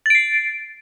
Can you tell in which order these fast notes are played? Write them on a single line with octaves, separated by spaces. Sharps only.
A6 D7 C7